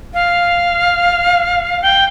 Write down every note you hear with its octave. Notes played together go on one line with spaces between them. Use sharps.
F5
G5